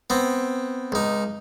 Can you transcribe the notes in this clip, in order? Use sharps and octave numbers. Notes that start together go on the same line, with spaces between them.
B3 C4
C#2 D#4